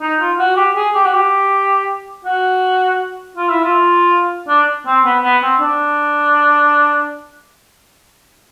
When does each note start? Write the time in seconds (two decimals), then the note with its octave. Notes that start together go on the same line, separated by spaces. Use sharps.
0.01 D#4
0.20 F4
0.39 F#4
0.57 G4
0.76 G#4
0.95 G4
1.05 F#4
1.13 G4
2.25 F#4
3.37 F4
3.50 E4
3.64 F4
4.49 D4
4.86 C4
5.05 B3
5.23 B3
5.42 C4
5.61 D4